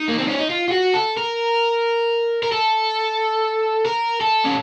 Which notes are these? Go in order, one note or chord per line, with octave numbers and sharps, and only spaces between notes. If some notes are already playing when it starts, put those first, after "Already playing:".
Already playing: D#4
A#3
C4
C#4
D#4
F4
F4
F#4
A4
A#4
A#4
A4
A#4
A4
C#4